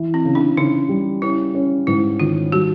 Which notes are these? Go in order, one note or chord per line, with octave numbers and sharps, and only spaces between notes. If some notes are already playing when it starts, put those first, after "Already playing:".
Already playing: E3
C4
C#3
D4
C#3 D#4
G3
C#4 E4
C#4
G#2 E4
D#3 F4
G3 F#4